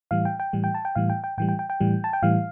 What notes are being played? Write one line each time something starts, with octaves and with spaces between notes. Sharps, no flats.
A2 E3 G3 F5
G5
G5
A2 E3 G3
G5
A5
G5
A2 E3 G3 F5
G5
G5
A2 E3 G3 G5
G5
G5
G5
A2 E3 G3
A5
G5
A2 E3 G3 F5